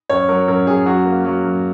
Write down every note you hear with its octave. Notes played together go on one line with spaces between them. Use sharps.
F#2 C#5
F#3 A#4
F#2 A#4
F#2 G#4
F#3 F#4
A#3
F#3
F#2